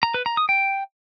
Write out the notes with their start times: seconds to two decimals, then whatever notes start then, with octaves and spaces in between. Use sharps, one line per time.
0.03 A#5
0.14 B4
0.26 A#5
0.37 D#6
0.49 G5